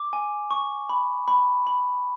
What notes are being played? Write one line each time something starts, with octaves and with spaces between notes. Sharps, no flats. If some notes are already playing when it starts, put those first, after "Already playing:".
Already playing: D6
G#5
C#6
B5
B5
B5